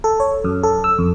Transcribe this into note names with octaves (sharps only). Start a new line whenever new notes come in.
A4
C#5
F#2
A4
E6
F2